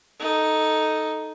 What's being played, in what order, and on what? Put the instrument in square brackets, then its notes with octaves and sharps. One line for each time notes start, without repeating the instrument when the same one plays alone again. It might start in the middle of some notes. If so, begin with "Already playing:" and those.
[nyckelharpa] D#4 A4